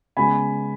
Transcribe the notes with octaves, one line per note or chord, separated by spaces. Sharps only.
C#3 G#3 B3 G#5 B5